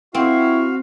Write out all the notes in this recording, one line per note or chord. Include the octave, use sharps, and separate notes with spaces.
C4 E4 F#4 F5